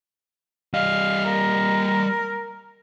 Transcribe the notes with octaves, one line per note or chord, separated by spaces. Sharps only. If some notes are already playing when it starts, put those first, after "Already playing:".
G3 D#5 F5
A#4